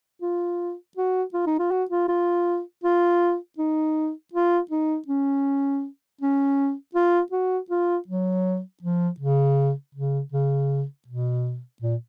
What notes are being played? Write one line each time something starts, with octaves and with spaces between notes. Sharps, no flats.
F4
F#4
F4
D#4
F4
F#4
F4
F4
F4
D#4
F4
D#4
C#4
C#4
F4
F#4
F4
F#3
F3
C#3
C#3
C#3
B2
A#2